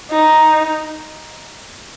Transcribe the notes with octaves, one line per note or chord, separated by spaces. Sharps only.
D#4